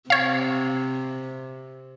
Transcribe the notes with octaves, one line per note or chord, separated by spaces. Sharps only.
C3 C#5 F5